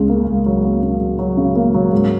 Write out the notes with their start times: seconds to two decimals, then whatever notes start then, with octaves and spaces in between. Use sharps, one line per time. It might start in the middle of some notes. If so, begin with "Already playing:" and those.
Already playing: C#2 C#3
0.10 A#3
0.28 C#2
0.46 F#3
0.64 A#3
0.83 C#3
1.01 F#3
1.19 F#3
1.37 C#3
1.56 A#3
1.74 F#3
1.92 G#2